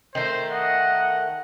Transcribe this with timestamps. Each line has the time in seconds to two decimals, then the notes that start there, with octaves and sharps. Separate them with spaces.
0.15 D#3 A3 C5
0.52 D#5 F#5